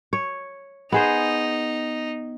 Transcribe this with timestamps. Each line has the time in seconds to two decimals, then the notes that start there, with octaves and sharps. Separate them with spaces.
0.13 C#5
0.92 B3 D#4 G#4 C5